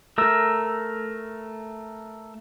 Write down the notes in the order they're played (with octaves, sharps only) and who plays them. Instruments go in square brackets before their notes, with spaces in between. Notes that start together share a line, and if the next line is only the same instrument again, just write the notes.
[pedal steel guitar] A3 A#4 E6